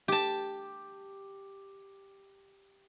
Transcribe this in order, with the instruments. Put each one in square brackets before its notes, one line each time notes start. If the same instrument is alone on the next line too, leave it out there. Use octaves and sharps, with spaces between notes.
[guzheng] G4 A5